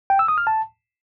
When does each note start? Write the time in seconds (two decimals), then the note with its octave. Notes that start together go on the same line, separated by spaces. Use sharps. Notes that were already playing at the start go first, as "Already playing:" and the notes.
0.10 G5
0.19 E6
0.28 D#6
0.38 F6
0.47 A5